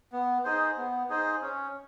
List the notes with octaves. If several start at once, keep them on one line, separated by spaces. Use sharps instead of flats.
B3
D#4 G#4 C5
B3
D#4 G#4 C5
C#4